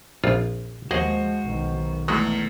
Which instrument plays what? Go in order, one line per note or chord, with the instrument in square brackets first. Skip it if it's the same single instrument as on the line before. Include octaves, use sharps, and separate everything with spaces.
[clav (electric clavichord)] A#1 F2 F4
[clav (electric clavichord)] D#2 G#4 D#5 [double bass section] F3 G#3 [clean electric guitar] F#4 [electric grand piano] C5
[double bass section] B1 D#3
[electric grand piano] E2 A3 [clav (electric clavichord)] F#3 G#3